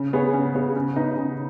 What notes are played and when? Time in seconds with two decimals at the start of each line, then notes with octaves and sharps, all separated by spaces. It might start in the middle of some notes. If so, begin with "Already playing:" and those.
Already playing: C#3
0.13 B3 G#4 C#5
0.34 C#3
0.54 B3 G#4 C#5
0.75 C#3
0.96 B3 D#4 B4
1.17 C#3